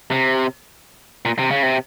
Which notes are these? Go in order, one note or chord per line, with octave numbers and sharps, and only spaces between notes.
C3
A#2
C3
C#3
C3